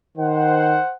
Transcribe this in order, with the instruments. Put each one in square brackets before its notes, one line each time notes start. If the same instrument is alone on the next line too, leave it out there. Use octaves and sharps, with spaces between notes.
[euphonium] D#3 [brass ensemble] C5 F#5